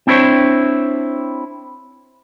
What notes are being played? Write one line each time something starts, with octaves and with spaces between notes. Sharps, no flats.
C4 D4 E4 C5 C#5